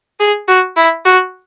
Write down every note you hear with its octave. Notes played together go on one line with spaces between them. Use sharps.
G#4
F#4
E4
F#4